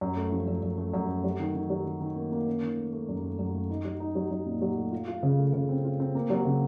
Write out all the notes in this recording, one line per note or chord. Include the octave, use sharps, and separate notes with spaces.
F#2
A3
F3
F#2
F#2
A3
F#2
A3
F#3
D#3
D#3
F#3
D#3
D#3
A#3
A#3
C#4
D#3
A3
A3
F#2
A3
F#2
A3
D#4
F#3
D#4
F#3
F#3
A#2
F#3
A3
F4
F4
C#3
A3
C#3
C4
F4
C4
A#3
F#3
C#3